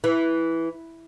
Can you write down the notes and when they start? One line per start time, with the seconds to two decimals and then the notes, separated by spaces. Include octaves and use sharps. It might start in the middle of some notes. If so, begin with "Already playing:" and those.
0.04 E3